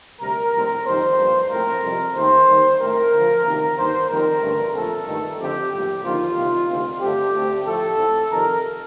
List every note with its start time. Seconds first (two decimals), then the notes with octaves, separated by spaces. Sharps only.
0.21 D2 C3 G3 A#4
0.53 A#1 A2 G3 C4 A#4
0.86 F2 D#3 G3 A#3 C5
1.19 G2 F3 A#3
1.50 A2 F3 C4 A#4
1.83 F2 C3 G3 C4
2.15 D#2 D#3 A3 C4 C5
2.48 D#2 D#3 G3
2.80 A2 A3 C4 A#4
3.13 D2 D3 F3
3.45 D2 C3 D#3 A#3
3.77 G2 D#3 A#3 C5
4.09 F2 D#3 G3 A#3 A#4
4.42 A1 G2 D3 A3
4.74 A#1 A#2 A3 C4 A4
5.07 G2 D#3 A3
5.40 F2 D3 A3 C4 G4
5.71 A#1 A2 G3 G4
6.03 D#2 D3 F3 A#3 F4
6.36 C2 C3 D#3 A#3
6.68 D2 C3 D#3 G3 C4 F4
7.00 G2 D3 A3 C4 G4
7.34 D2 D3 A3 C4
7.66 A2 F3 A3 C4 A4
7.98 A2 A3 C4
8.30 F2 C3 D#3 A#4